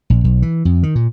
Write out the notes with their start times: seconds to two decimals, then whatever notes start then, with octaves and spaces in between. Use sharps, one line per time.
0.10 A#1
0.24 B1
0.42 E3
0.65 F2
0.83 D#3
0.95 A#2